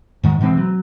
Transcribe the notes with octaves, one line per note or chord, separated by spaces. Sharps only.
G#2 D#3 G#3
B2 E3 G#3 C4
F#3